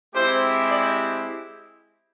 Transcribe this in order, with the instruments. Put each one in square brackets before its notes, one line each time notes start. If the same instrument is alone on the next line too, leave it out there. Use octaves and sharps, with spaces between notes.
[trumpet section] G#3 C4 E4 G4 C5
D5